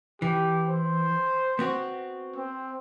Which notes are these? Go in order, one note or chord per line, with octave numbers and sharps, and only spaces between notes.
E3 G4
C5
B3 C4 F#4
C4